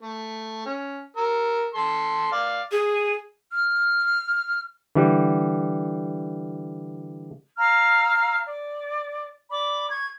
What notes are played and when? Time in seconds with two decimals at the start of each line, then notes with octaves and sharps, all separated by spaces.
0.02 A3
0.66 C#4
1.17 A#4 E6
1.74 A4 C6
2.32 D5 F5
2.71 G#4
3.52 F6
4.95 D3 E3 G3
7.57 F5 A#5 E6 F6
8.46 D5
9.50 D5 B5 D6
9.90 C#6 G#6